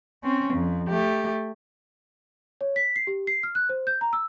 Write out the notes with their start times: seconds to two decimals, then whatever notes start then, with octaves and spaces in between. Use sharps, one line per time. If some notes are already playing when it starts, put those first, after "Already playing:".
0.23 C4 C#4
0.54 F2
0.89 A3 G4
2.61 C#5
2.76 B6
2.96 C7
3.07 G4
3.27 C7
3.43 F6
3.55 F#6
3.69 C5
3.87 G6
4.01 A#5
4.13 E6